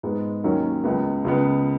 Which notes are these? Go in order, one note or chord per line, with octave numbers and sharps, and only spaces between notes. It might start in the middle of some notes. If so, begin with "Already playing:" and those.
G#2 G#3 B3
D#2 D#3 F#3 C#4
C#2 C#3 B3
C#2 C#3 B3